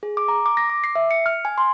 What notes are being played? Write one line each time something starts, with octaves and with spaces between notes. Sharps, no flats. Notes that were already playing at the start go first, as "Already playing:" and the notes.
G#4
D6
A#5
D6
A#6
D6
C7
E5
C#7
F6
G#5
C6